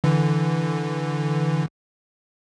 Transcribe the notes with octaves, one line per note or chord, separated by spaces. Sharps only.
D3 E3